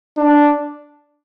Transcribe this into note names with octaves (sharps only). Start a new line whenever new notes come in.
D4